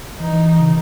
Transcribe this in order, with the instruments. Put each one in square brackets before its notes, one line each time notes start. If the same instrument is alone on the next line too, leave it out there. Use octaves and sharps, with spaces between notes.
[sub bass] E3 [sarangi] D#4
[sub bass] C#3